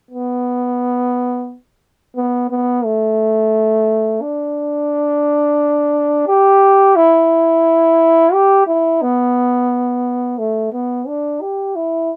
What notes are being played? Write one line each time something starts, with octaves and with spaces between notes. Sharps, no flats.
B3
B3
B3
A3
D4
G4
E4
G4
E4
B3
A3
B3
D4
G4
E4